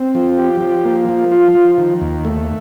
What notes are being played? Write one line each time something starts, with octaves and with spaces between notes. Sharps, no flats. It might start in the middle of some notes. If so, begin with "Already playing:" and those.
Already playing: C4
F3
G4
F3
A#3
F3
F4
F3
D#3
D#2
A3